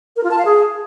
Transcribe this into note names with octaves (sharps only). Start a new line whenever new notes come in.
A#4
F4
A5
F5
G#4